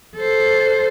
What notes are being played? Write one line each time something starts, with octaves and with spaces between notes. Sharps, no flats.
A4 C5